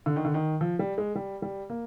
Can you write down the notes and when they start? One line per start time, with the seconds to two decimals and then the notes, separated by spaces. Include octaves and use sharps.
0.06 D3
0.16 D#3
0.25 D3
0.34 D#3
0.61 F3
0.79 G3
0.98 G#3
1.15 G3
1.42 G3
1.70 A#3